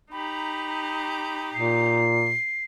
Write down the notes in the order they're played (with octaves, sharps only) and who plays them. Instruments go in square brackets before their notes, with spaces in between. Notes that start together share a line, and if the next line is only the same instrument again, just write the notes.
[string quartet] D#4 G4 A#5 [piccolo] B5
[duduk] A#2 [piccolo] C7